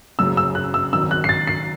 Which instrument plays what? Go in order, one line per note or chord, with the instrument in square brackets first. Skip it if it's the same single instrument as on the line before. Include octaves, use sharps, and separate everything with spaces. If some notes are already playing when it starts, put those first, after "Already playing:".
[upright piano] F#1 F#2 C#3 [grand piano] E6
[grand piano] E6
F#6
E6
[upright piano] G#1 F#2 D#3 [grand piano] E6
[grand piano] F#6
C7
A6
C7